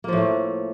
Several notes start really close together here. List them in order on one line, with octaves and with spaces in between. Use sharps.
A#3 F3 A2 A3